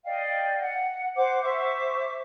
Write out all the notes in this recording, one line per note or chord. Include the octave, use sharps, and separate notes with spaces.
D5 D#5 F5 G5
F#5
C5 F#5 D6
C5 E5 C#6 D6